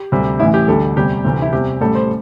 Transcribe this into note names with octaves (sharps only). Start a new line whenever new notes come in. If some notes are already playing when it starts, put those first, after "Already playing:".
Already playing: G4
D2 C3 G3
A1 A2 E3 E4
G4
D2 D3 G3 A4
E2 C3 G3 G4
D2 C3 E3 G3
E4
E2 C3 G3 G4
A1 A2 G3 A4
C5